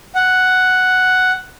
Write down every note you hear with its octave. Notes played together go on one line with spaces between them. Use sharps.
F#5